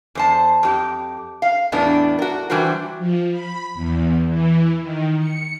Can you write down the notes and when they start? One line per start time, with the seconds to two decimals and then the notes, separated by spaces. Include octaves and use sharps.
0.15 E2 C5 A5
0.63 F2 G4
1.42 F5
1.72 E2 A2 G3 B3 D4
2.19 F#4 A#4
2.50 E3 G3 D4 F#4 C5
2.99 F3
3.31 B5
3.74 E2
4.28 E3
4.81 D#3
5.19 C#7